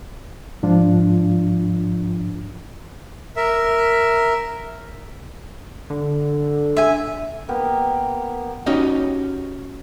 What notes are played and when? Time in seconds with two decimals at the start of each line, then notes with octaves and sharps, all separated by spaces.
0.63 G#2 F3 D4 F4
3.36 A#4 E5
5.90 D3
6.77 E5 G#5
7.49 A#3 B3 G4
8.66 C#4 D#4 F#4 G4 D#5